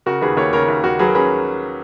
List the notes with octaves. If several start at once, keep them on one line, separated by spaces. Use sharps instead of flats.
C#3 F#4 A#4
D#2 G#4 B4
D#2 A#4 C#5
C#3 A#4 C#5
D#2
D#2 F#4 A#4
F#3 G#4 B4
A#4
C#4 G#4 B4